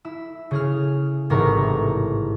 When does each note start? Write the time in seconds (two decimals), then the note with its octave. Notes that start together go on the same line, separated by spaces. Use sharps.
0.05 E4 E6
0.51 C#3 G#4 F6
1.30 A1 G#2 C3 A#4 B5 C#6